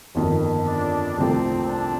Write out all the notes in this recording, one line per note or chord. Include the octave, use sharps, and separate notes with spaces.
G1 F2 D#3
D4
C2 C3 F3 A3 C4
D4